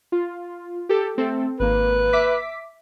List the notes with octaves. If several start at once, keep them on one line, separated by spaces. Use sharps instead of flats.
F4
G4 A4
A3 C4 A4
G#1 A#3 B4
E5 D6 B6